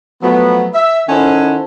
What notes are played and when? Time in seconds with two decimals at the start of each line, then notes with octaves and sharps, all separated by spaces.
0.22 F3 F#3 A3 B3
0.74 E5
1.08 D#3 C#4 E4 A4 C5 F#5